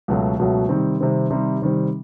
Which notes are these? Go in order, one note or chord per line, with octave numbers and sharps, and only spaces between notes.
C#2 B2 F#3 A3
C#2 B2 F#3 A3
C3 D#3 G3 C4
C3 D#3 G3 C4
C3 D#3 G3 C4
C3 D#3 G3 C4